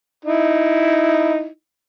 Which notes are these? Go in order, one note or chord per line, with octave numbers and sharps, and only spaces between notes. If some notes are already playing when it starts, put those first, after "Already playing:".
D#4 E4